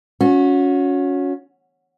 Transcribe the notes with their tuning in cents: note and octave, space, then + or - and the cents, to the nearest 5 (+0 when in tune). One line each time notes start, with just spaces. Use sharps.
C#4 +15 F#4 -30